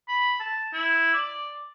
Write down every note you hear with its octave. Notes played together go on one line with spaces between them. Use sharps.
B5
A5
E4
D5